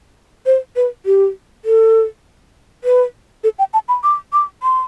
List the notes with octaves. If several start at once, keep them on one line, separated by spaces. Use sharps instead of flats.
C5
B4
G4
A4
B4
A4
G5
A5
B5
D6
D6
C6